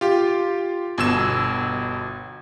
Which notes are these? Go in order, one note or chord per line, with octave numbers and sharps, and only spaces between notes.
F4 G4
G1 B2 E6 E7